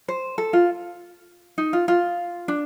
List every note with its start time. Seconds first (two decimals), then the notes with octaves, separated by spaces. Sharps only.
0.08 C5
0.38 A4
0.53 F4
1.58 D#4
1.73 F4
1.88 F4
2.48 D4